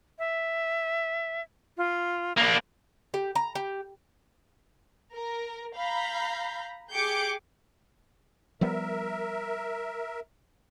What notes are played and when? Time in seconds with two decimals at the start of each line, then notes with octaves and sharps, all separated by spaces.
0.19 E5
1.78 F4
2.37 A#3 D4 D6
3.14 G4
3.35 A#5
3.55 G4
5.14 A#4
5.75 F5 A#5 B5 G6
6.93 G4 G#4 D6 G6 C#7 D7
8.61 F3 G3 B3 A#4 E5